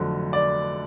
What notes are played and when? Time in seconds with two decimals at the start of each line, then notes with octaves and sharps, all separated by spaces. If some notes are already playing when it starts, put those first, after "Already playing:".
Already playing: F1 F2 D3 F#3
0.33 D5